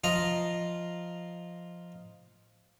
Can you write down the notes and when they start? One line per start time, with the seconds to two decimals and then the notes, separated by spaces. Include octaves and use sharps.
0.04 F3 F4 D#5 A#5